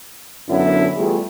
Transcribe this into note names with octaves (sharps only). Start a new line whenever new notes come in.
F#2 D3 B3 C#4 D4 E4
E2 G3 A3 F4 G#4